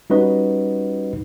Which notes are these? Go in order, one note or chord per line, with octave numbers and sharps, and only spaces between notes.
G3 C#4 D#4 F#4 B4 D#5